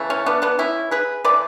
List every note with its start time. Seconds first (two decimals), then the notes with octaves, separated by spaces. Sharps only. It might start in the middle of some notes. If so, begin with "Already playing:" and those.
Already playing: C#3 E3 A3
0.10 C#4
0.26 B3 D4
0.42 B3 D4
0.59 C#4 E4
0.91 G#4 B4
1.25 C#3 E3 A3 B4 D5